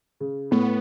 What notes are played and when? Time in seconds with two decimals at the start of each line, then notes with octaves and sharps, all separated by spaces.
0.20 C#3
0.51 A2 B3